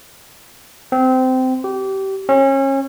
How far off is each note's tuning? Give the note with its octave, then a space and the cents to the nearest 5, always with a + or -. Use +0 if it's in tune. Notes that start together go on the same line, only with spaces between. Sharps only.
C4 -20
G4 -25
C#4 -30